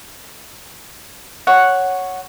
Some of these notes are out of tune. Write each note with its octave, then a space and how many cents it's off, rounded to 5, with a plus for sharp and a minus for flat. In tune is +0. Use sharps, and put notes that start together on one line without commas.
C#5 +0 F#5 +0